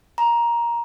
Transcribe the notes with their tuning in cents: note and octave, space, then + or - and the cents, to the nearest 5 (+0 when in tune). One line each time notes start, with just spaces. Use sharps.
A#5 +10